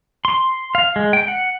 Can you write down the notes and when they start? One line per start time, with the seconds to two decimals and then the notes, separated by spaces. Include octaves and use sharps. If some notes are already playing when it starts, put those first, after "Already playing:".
0.25 C6
0.75 F5
0.96 G#3
1.13 G5
1.28 F#5